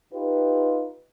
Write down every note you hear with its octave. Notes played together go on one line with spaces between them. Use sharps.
D#4 F4 G4 B4